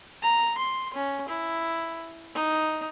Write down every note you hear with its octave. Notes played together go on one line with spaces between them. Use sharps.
A#5
C6
C#4
E4
D#4